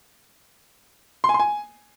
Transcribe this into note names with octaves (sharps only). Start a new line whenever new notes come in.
C6
G#5
C6
G#5